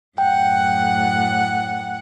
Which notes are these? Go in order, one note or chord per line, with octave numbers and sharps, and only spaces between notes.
F#2 A2 F#5 G5